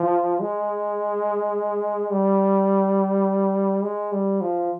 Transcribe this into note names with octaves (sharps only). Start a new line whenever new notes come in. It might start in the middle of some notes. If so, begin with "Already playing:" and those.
Already playing: F3
G#3
G3
G#3
G3
F3